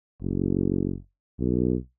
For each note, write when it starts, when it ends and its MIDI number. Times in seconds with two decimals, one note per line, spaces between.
0.21 0.96 30
1.39 1.76 35